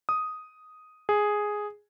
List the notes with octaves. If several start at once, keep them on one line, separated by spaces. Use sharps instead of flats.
D#6
G#4